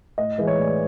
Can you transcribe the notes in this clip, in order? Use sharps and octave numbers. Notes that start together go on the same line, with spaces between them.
A2 D#5
E3 G#3
C#5
A2 D5